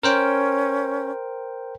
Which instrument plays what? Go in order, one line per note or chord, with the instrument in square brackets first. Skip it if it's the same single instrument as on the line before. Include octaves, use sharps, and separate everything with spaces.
[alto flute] C#4 [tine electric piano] A#4 C5 G5